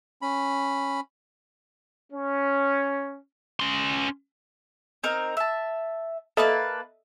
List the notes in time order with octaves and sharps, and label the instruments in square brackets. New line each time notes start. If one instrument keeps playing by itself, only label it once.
[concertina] C#4 B5
[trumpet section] C#4
[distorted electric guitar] C#4 C6
[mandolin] C4 D#4 A#4
E5 A5
[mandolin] A#3 B4 A5 [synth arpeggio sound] A4 D#5 E5